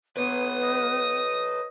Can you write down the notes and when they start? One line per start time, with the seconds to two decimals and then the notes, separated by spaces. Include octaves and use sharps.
0.17 B3 B4 C#5 D#6
0.63 D#5